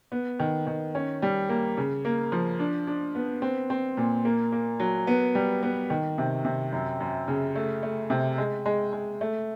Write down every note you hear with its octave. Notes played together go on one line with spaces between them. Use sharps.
B3
D#3
D#3
C#4
G3
A#3
C#3
A#3
F3
D4
D4
B3
C4
C4
A#2
A#3
A#3
F#3
B3
G3
B3
D#3
C3
C3
F#2
F#2
C#3
A3
A3
C3
G#3
G#3
G#3
A3